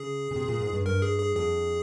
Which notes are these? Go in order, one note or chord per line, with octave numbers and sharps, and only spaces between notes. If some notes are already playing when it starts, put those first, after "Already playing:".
Already playing: C#3 G#4
C#3
C3
A#2
G#2
G2
G2 A#4
G#4
G#4
F2 G#4